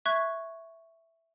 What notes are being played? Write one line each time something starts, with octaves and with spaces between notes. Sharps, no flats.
E5 C#6 F#6 G#6